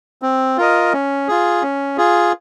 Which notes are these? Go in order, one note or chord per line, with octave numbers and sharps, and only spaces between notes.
C4
F4 A#4 D#5
C#4
F4 G#4
C#4
F4 G#4